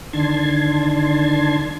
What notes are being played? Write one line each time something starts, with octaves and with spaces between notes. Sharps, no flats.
D3 D#3 D4 A5 C6 G#6